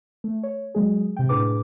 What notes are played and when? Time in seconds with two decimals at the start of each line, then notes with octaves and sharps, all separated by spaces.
0.24 A3
0.43 C#5
0.75 F#3 G#3 G#4
1.17 C3 G5
1.29 A2 D4 G#4 B4 D6